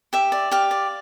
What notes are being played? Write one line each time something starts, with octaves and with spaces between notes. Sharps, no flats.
G4 E5
D5
G4 F5
D5